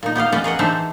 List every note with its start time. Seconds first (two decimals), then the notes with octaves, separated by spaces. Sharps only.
0.03 A#2 D#4
0.15 B3 G4 D#5 F5
0.32 C#4 B4 D5 D#5
0.44 G#4 A#4 D#5 F#5
0.59 E3 D4 D#4 C5 E5